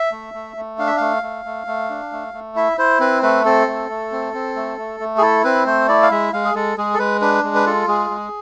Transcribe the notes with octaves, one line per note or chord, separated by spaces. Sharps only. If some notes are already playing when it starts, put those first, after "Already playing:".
Already playing: E5
A3
A3
A3
D4 F5
E5
A3 F5
A3
A3
A3
D4
A3
A3
E4 E5
E4 C5
C4 B4
A3 B4
C4 A4
A3
A3
C4
C4
A3
A3
A3
G#4
E4 A4
C4 B4
A3 C5
E4 D5
F5
G#3 E5
G#3 F5
G#4
G#3 A4
G#3 G#4
A4
G#3 B4
D4 B4
G#3
B4
F4 A4
G#3 G#4
G#3